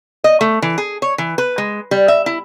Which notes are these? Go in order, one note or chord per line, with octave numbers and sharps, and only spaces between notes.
D#5
A3
E3
G#4
C#5
E3
B4
G#3
G3
E5
E4